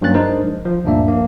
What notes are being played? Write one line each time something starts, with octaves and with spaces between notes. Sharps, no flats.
G2 F#3 A#3 C#4 F#6 A6
G#3 D4 D#4 A#4 C5
A#1
F3
D2 G2 A#2 A#3 D4 E5
A#1 A#3